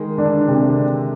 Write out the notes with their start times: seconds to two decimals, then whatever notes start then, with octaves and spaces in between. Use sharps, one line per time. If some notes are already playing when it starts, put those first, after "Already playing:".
Already playing: D#3 G#3
0.18 D3 D4
0.48 C3